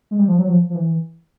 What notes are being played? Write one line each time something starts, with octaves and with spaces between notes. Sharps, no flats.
G#3
G3
F3
F#3
F3
F3
E3